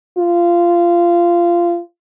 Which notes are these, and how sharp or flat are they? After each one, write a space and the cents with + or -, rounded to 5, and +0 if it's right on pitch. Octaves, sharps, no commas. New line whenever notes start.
F4 -15